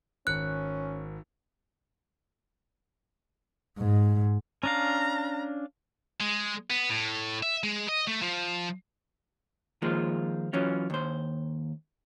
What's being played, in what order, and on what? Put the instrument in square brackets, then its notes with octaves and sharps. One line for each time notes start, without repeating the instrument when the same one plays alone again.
[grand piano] G#1 C#7 [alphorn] C#4 [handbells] F#6
[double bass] G#2
[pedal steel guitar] C#4 D4 F5 [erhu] A#5
[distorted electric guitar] G#3
B3
A2
E5
G#3
D#5
A3
F3
[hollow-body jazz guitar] D#3 F3 G#3 A#3 F4
E3 F#3 C#4 F4
D#2 C5